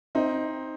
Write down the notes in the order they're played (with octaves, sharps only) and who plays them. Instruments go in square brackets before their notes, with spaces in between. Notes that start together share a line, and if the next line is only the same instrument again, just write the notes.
[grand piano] C4 D#4